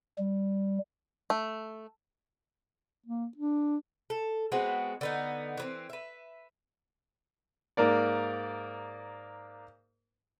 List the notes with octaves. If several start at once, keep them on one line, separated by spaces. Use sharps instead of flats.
G3
A3
A#3
D4
A4
G#3 B3 C4 F#4
D3 B3 D#4
E3 B3 C4
B4 E5
G#2 A#3 A#4 D5